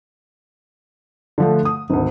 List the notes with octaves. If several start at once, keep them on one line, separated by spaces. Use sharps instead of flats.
D3 F3 A3
D#6
G#1 D2